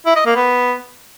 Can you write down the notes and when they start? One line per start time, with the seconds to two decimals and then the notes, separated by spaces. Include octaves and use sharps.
0.06 E4
0.16 D#5
0.26 A#3
0.36 B3